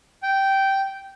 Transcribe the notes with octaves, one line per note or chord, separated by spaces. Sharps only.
G5